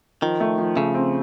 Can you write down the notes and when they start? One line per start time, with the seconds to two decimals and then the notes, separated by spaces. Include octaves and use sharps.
0.22 D#3 F3
0.40 A3
0.58 F3
0.76 C#3 A3
0.95 C4